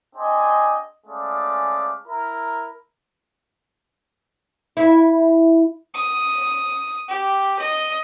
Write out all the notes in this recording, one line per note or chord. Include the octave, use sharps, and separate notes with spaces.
C4 D4 G#4 C5 D#5 G#5
G#3 A3 C#4 G#4 D5 F5
E4 A#4 A#5
E4
D#6
G4
D#5